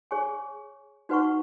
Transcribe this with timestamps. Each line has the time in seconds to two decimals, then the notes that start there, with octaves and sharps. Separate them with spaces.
0.11 G#4 C#5 G#5 C#6
1.09 D#4 F#4 B4 F#5 C#6